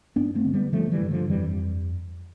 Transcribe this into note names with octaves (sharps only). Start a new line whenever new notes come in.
G2 B3 D4
A3 C4
D3
G3 B3
D3 F3 A3
E3 G3
G2
D3 F3
F2 E3 G3